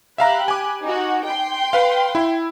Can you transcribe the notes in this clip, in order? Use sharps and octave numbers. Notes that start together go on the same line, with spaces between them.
G4 E5 F5 A#5 B5 F#6
G#5 D6
D#4 F#4
G5 C6
B4 F5
E4